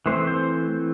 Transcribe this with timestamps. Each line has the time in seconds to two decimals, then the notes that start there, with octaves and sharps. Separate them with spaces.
0.06 E3 A3 C4 C5
0.27 C5